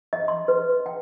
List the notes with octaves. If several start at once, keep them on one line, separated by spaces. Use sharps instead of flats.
D#5
C6
B4
G5